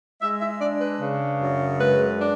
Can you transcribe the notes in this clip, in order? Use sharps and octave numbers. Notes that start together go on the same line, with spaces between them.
G#3 E5
E5
D4 D5
B4
C#3
F#2
G#3 B4
D4